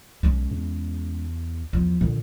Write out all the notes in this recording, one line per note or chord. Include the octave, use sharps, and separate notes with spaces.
B1 G#3 C#4
E2
E2 F3
A#2 D3